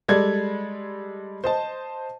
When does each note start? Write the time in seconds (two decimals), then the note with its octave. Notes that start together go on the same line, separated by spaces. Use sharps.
0.08 G3 G#3 A4 D5 G#6
1.44 C5 D#5 A5